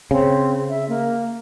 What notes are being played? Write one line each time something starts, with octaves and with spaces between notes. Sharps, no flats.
C#3 C4
E5
A#3